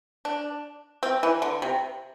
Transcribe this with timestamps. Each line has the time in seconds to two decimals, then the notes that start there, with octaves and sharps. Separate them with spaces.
0.25 D4
1.03 C4
1.23 E3
1.42 D3
1.62 C3